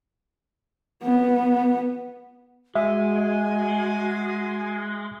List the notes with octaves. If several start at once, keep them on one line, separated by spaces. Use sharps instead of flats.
B3
G#3 F#4 E5 G#5